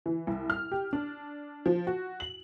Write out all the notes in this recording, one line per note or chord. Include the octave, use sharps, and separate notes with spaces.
E3
C2
F6
G4
D4
F3
F#4
F#7